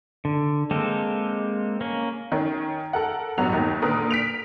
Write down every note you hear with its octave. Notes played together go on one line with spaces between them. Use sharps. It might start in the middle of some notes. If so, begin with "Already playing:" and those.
D3
G#3 A#3 C4 G4 A4
A#3 C#4
D#3 C#4
A4 A#4 F#5
A1 G2 F#3 B3 F#4 F7
D#2 D#3
A#2 D3 A#4 B4 D#6
B6 D7 F7